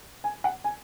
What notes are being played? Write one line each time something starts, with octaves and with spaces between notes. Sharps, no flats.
G#5
F#5
G#5